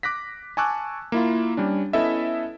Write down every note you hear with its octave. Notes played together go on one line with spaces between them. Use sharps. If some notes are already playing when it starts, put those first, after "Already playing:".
D6 F#6 A#6 B6
G#5 A5 C#6 D6 E6 F#6
A#3 E4 F4
G3 C#4 D4
B3 C#4 E4 A4 D#5 E5